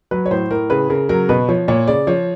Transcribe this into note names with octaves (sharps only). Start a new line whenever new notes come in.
F#3 B4
C#5
A2 C5
A2 A#4
C#3 B4
C#3 A#4
F#3 A#4
B2 B4
F3 C#5
A#2 C#5
C#3 D5
F3 C#5